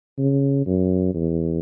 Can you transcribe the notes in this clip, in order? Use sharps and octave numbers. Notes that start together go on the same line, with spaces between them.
C#3
F#2
E2